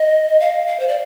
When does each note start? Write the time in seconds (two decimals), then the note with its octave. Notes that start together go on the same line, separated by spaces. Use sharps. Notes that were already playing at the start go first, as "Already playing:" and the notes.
Already playing: D#5
0.40 F5
0.67 F5
0.80 C5
0.88 D5